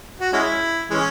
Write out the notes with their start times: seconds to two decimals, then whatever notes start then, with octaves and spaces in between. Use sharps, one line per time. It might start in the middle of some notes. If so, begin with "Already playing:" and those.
0.20 F#4
0.33 G#3 C#4 E4
0.91 E3 G#3 C#4